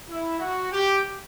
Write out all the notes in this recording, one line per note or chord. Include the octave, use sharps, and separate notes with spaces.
E4
F#4
G4